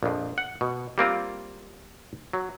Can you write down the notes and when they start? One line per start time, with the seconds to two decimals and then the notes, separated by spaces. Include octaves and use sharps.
0.03 A#1 F2
0.38 F#5
0.61 B2
0.98 G3 A#3 C4 F4
2.33 F#3